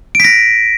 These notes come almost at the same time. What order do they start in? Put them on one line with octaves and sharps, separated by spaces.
D7 B6 A#6